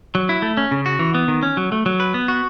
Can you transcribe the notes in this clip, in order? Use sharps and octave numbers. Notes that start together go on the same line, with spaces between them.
F#3
E4
A3
C#4
C#3
F#4
E3
B3
D#3
C#4
F#3
A3
F#3
B4
B3
F#4